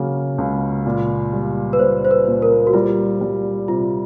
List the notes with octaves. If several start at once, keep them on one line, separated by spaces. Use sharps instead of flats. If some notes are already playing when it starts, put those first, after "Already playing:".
Already playing: C#3 F#3 A#3
C#2
A#2
G3
B4
A#2 C5
C5
B4
A#2
A#4
F#4
G3 F4
G3
C3 F4